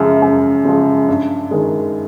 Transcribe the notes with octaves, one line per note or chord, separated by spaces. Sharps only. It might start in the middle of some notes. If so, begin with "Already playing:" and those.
Already playing: F#2 C#3 F3 G#3
F#2
C#3 F3 G#3
G2
D#3 G#3